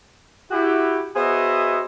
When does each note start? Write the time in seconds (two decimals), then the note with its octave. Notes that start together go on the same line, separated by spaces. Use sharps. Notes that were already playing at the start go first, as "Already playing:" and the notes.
0.51 E4 F#4 G4
1.15 B3 F#4 G#4 C5 D#5 E5